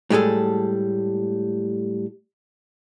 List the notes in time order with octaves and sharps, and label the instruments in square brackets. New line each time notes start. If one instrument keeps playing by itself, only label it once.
[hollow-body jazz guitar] A2 G3 G#3 G#4 A4